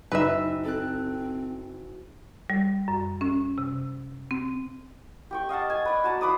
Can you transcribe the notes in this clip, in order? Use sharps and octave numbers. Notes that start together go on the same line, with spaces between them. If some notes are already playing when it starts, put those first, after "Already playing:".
F#1 D#4 B4 E5 E6
C4 A4 F#6
G3
F#2
C#4
C3
C4
G4 G5 C#6
D#5 F5 F#5 A5
G#5
B4 D5
F#4 A5 A#5
F3 B4 D6 D#6